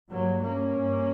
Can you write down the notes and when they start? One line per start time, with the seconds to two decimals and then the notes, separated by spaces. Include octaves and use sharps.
0.11 G2 F#3 A#3
0.43 A#3 C#4
0.76 G2